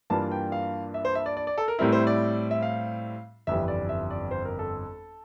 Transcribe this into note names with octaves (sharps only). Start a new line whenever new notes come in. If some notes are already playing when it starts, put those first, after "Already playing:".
G2 E3 A#3 D4 F4 A5
G5
F5
E5
C5
E5
D5
D5
D5
A4
A#4
A2 G3 C4 E4 A#4
C5
D5
E5
F5
G1 F2 E3 G3 E5
D5
E5
D5
C5
A#4
A4